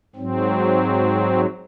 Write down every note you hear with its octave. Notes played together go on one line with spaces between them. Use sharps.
G#2 F#3 C4